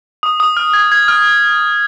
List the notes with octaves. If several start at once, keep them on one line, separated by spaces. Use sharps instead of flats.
D#6
D#6
F6
G#6
G#6
F6